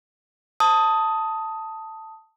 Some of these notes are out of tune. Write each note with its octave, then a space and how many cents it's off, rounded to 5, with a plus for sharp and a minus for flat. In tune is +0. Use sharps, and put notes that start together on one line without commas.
A5 +10 D#6 +10